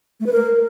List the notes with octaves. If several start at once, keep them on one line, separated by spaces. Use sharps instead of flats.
A3
B4
A#4